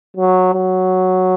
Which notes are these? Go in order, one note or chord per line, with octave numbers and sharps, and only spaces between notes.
F#3
F#3